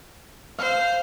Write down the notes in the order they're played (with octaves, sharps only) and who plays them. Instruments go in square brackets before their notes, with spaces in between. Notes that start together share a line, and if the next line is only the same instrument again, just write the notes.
[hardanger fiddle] C5 [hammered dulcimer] F5